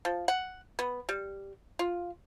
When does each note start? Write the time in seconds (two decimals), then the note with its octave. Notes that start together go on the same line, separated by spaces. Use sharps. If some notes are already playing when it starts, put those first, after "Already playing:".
0.05 F3
0.28 F#5
0.79 B3
1.09 G3
1.79 F4